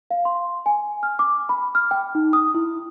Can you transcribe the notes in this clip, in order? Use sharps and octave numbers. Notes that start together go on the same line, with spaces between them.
F5
C6
G#5
F6
D6
B5
F6
G5
D#4
D#6
E4